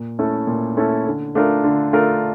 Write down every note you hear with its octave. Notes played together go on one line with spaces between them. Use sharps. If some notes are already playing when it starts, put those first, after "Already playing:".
Already playing: A#2
A3 C#4 E4 A4
A#2
A3 C#4 E4 A4
D3
A3 D4 F4 A#4
D3
A3 D4 F4 A#4